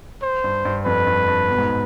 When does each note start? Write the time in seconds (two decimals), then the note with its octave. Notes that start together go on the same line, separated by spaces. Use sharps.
0.22 C5
0.44 G2
0.65 G2
0.85 F2 B4
1.07 G2
1.28 G2
1.48 B2
1.58 G#2